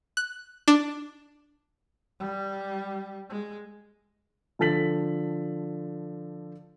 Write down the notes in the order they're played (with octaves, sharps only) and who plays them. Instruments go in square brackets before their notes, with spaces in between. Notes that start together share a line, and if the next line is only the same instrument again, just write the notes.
[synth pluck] F#6
D4
[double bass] G3
G#3
[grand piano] D3 F3 A4 A6 B6 F#7